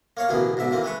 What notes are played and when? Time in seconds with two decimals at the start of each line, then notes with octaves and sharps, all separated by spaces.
0.17 A#3 C#5 F5
0.29 A1 D2 B2 A#3 B3 G#4
0.57 G#2 B2 D3 E5
0.71 D#3 E3 A#3 C4
0.83 G#3 A3 B4 C#6